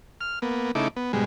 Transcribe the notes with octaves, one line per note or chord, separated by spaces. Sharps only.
F6
A#3 B3
C#3 A3 D#4 E4 D6
B3
G#2 B2 G3 G#3